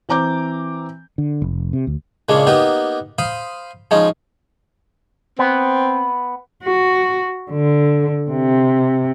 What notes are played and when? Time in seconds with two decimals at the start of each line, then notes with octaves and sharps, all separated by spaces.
0.09 E3 C4 A#5 D6 G6
1.18 D3
1.42 F1
1.73 C3
1.87 D2
2.29 A#2 C#3 G#3 A#3 D4
2.47 A#3 B3 D#4 G4 B4
3.18 C5 F5 B5 C6 D#6
3.91 F3 G#3 C#4 D#4
5.39 B3 C4
6.63 F#4
7.51 D3
8.31 C3